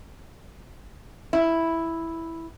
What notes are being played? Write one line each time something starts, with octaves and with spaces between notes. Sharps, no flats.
E4